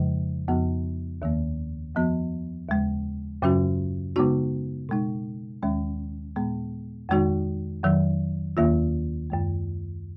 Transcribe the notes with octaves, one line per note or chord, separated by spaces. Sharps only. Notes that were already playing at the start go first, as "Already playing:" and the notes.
Already playing: F2 C#3 F3 G#3
F2 F3 B3 F#4
D#2 D#3 A#3
F2 F3 B3 F#4
D#2 C#3 G#3
F#2 C#3 F#3 C#4 F#4
C#3 G#3 B3 D#4 F#4
B2 G#3 D#4
D#2 D#3 G#3 C#4
A#2 G#3 B3
F2 D#3 G#3 D#4 F#4
F2 D#3 F#3
D#2 D#3 A#3 F4
F#2 D#3 G#3